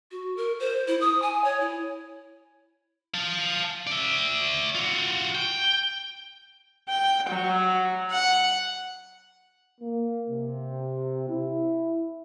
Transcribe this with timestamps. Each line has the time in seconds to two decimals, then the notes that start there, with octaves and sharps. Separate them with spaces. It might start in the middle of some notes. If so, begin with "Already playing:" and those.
0.11 F#4
0.37 A#4
0.60 C5
0.88 E4
1.01 D#6
1.22 G#5
1.44 C#5
1.60 E4
3.14 F5 A5
3.87 D5 E5
4.75 F4 F#4
5.35 G5
6.89 G5
7.29 F#3
8.11 F#5
9.81 A#3
10.29 C3
11.28 E4